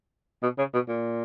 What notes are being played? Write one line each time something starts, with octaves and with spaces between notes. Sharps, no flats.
B2
C#3
B2
A#2